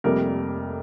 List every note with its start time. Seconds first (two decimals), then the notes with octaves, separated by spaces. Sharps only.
0.04 F1 F2 C3 G3 A#3 A#4